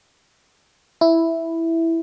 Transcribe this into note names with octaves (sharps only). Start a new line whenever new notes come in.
E4